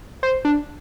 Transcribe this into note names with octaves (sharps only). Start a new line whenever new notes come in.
C5
D4